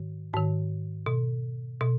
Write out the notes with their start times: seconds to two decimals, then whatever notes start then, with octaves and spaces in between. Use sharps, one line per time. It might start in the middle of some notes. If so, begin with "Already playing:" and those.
Already playing: G#2 D#3
0.33 G#2 D#3
1.06 B2
1.81 B2